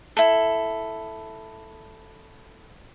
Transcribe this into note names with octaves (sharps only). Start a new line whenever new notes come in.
E4 A4